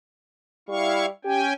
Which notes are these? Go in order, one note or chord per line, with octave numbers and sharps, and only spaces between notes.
G3 E4 F5 C#6
C#4 G4 G5 G#5